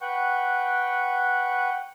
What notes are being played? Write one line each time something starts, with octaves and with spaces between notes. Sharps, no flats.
B4 F#5 G5 C#6